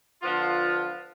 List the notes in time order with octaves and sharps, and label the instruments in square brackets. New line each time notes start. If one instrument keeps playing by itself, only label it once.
[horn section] D3 F3 B3 F4